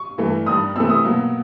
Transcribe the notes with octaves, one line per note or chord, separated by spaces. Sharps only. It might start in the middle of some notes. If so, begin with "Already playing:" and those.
Already playing: C#6
G2 E3 A3
G2 D#3 G3 D#6
C3 E3 A3 E6
D#6
B2 F#3 A#3